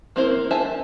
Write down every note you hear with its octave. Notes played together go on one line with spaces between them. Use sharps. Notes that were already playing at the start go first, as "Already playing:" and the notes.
A#3 C4 E4 A#4 C5
C5 E5 G#5 A5